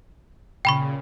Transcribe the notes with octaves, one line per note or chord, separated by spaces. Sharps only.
A#2 C#3 G5 B5 C#6